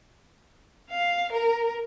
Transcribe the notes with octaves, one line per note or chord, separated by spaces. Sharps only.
F5
A#4